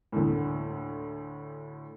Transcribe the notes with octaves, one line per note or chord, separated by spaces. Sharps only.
D2 A2